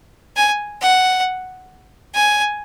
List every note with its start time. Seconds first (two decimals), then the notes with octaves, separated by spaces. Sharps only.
0.36 G#5
0.81 F#5
2.14 G#5